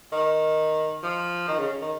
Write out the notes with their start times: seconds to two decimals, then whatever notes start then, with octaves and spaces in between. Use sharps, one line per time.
0.12 D#3
1.03 F3
1.48 D#3
1.59 C#3
1.82 D#3